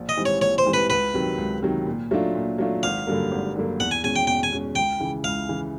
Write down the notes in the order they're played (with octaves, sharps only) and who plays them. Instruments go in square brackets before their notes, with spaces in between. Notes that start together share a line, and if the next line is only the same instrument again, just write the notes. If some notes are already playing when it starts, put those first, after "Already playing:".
Already playing: [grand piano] A#1
[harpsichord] D#5
[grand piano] G#2 E3 G3 C4
[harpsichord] C#5
[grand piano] A#1 [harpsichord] C#5
[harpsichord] C5
[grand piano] G#2 E3 G3 C4
[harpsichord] B4
[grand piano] C#2 [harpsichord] B4
[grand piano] C3 D#3 F#3
C#2
C3 D#3 F#3
A#2
F#3 A3 D4 F4
A#2
F#3 A3 D4 F4
[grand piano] G#1 [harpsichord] F5
[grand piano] G2 D3 F#3 A#3
G#1
G2 D3 F#3 A#3
[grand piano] E2 [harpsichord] F#5
[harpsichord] G#5
[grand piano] B2 G#3 C#4 [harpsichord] G#5
[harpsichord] G5
[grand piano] E2 [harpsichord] G5
[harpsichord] G#5
[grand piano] B2 G#3 C#4
[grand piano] C#2 [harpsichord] G5
[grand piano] C#3 E3
[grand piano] C#2 [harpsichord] F5
[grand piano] C#3 E3